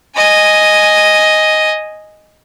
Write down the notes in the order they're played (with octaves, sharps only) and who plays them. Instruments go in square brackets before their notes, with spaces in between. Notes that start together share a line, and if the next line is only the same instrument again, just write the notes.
[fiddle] D#5 G#5